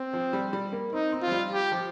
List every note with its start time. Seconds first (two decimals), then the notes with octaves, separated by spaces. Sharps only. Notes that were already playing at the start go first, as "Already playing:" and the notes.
Already playing: C4
0.13 F3
0.33 G3
0.53 G3
0.72 A#3
0.93 C4 D#4
1.12 C4
1.22 F3 F4
1.32 G3
1.52 G4
1.72 F3